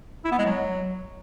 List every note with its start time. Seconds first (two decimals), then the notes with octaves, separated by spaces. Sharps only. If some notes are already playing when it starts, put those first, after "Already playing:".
0.25 E4
0.32 B3
0.38 G#3
0.45 F#3